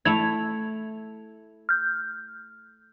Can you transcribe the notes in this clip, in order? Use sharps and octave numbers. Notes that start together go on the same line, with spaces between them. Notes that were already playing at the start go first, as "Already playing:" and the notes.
A3 E4 G#6 F7
F6 G6